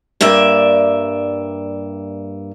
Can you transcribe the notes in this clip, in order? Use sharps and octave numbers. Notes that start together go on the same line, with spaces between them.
G2 A#3 D5 E5